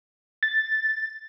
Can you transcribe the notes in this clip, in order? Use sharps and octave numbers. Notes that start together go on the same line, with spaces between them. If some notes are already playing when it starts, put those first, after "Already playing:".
A6